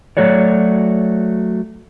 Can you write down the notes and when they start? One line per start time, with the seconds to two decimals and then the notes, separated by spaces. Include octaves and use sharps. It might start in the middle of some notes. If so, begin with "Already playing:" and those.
0.17 F#3 A3 F#4 C#5 D5